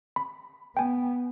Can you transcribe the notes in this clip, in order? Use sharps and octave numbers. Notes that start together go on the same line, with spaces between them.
B5
B3 G5 G#5